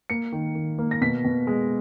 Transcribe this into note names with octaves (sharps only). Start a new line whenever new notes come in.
A#3 C#7
D#3
D#3
A#3
A#6
B2 B6
B2
G#3